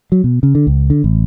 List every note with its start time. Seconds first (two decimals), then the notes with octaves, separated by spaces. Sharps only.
0.12 F#3
0.24 B2
0.43 C#3
0.55 D3
0.67 C#2
0.90 D3
1.04 A1